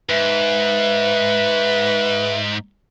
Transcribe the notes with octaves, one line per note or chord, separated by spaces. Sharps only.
G#2 B4 E5